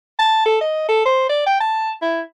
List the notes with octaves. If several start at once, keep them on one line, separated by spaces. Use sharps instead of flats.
A5
A4
D#5
A4
C5
D5
G5
A5
E4